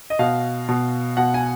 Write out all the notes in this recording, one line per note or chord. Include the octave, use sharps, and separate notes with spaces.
D#5
B2 F5
B2
B2 F#5
G#5